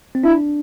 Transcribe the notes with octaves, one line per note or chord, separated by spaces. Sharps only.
C4
D4 E4